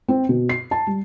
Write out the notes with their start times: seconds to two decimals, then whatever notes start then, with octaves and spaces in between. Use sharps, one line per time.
0.08 C4
0.29 B2
0.49 C7
0.71 A5
0.87 G3